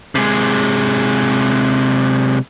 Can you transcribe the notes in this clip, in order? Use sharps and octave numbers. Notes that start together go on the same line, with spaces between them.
C3 G#3